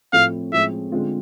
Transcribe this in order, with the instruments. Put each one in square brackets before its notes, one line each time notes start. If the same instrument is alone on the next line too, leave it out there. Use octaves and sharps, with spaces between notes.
[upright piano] A2 F3 A3 C4 [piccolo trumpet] F5
[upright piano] A2 F3 G#3 C4 G#4 [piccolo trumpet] E5
[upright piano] D3 G#3 C4 F4